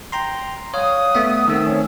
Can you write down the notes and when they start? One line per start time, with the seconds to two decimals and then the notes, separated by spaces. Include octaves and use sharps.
0.12 G5 A#5 C6
0.74 G3 C#5 F5 F#5 D#6
1.15 A3 B3 E5
1.48 D#3 A3 C4 E6
1.64 F3 C#4